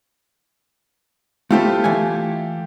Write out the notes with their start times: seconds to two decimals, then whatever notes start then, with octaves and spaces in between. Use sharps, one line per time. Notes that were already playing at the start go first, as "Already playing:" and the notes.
1.51 A3 E4 F4 G4 A4 C5
1.84 E3 A3 G#5